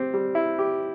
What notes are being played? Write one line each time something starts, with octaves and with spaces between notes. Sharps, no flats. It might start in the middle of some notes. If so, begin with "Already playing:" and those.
Already playing: C4 G4
G3
E4
G4